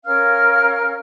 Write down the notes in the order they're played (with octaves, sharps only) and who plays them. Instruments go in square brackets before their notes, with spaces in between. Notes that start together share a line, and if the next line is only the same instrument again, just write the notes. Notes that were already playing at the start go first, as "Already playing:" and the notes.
[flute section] C#4 A#4 F5 F6